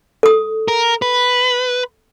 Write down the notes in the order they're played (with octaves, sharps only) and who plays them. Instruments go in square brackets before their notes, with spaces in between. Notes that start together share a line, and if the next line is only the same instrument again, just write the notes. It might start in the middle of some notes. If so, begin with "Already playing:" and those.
[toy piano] A4 D#6
[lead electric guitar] A#4
B4